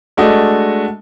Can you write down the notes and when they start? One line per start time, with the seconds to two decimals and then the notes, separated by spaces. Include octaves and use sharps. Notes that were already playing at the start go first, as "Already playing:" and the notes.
0.17 G#3 A3 D4 F#4 D#5